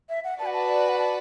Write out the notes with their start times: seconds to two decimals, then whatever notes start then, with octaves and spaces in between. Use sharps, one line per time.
0.09 E5
0.24 F#5
0.39 F#4 B4 D5 A5
0.46 F#5
0.53 A5
0.89 F#5
0.99 A5